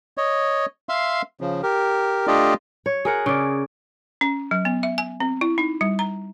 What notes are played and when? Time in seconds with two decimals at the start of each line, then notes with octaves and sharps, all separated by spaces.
0.17 C#5 D#5
0.89 E5 F5 C6
1.41 C#3 F3
1.63 G4 A#4
2.27 A3 D4 F4 G4 D5 D#5
2.86 C#5
3.05 G#4 A#4 F#5
3.26 C#3 D5
4.21 C#4
4.51 F#3
4.65 B3
4.83 E5
4.98 G#5
5.20 C4
5.41 E4
5.58 D#4
5.81 G3
5.99 A#5